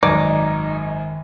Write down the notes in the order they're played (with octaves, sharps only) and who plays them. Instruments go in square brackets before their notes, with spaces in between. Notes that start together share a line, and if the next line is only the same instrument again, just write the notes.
[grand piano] G#1 F#2 [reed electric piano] D#3 G#6 [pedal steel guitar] D#4 [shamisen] D5